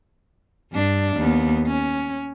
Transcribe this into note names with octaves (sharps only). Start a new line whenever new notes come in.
G2 D4
D#2 B3
C#4